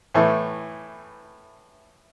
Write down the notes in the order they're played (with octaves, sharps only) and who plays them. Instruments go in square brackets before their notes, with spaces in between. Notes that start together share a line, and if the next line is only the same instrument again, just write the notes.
[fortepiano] A2 E3 A3